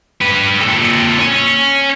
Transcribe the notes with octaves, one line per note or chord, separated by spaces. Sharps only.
G4 B4
A#2 A4
C#5 G#5